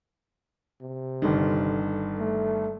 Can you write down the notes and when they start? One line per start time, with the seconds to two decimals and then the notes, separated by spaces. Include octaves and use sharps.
0.82 C3
1.22 G1 D3 D#3
2.19 A3